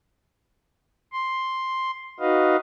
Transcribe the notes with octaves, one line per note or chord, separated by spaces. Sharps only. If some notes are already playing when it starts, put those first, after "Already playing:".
C6
D#4 F#4 B4 D#5 F5